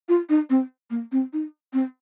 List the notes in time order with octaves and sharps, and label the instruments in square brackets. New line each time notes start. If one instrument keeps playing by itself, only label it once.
[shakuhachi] F4
D#4
C4
A#3
C4
D#4
C4